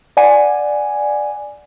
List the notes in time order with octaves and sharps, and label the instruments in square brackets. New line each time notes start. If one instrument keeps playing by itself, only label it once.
[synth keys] D5 F#5 G#5